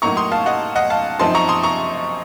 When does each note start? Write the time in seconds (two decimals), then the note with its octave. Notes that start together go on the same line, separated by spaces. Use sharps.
0.02 A2 F#3 A#3 D#4 A#5 C#6
0.17 C6 D#6
0.32 F5 A5
0.46 D#5 F#5
0.76 D#5 F#5
0.90 F5 A5
1.19 F#2 F3 C4 D#4 A5 C6
1.35 A#5 C#6
1.49 C6 D#6
1.63 A#5 C#6